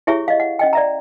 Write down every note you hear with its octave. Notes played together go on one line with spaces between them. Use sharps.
E4 G4 G#4 C#5 E5 C#6
D#5 F5
F#5
C#4 D#5 G5
D5 E5 A#5